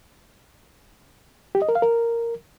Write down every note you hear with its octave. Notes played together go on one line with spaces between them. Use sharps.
G4
D#5
A#4
F5
A#4